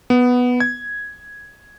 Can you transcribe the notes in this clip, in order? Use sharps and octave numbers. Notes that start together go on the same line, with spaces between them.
B3
G#6